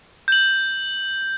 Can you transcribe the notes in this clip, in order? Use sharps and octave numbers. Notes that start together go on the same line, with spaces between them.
G6 F#7